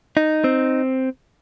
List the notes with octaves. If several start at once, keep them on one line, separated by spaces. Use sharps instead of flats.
D#4
C4